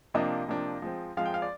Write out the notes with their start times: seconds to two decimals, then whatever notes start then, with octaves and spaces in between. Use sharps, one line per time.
0.14 C3 F3 A#3 D4 D#5
0.48 C3 F3 A#3 D4
0.82 F3 G#3 C4
1.17 F3 G#3 C4 F5
1.26 G5
1.34 F5
1.42 D5